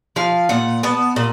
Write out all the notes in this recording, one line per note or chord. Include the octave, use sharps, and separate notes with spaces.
F3 F5
A#2 F#5
B3 A5
A#2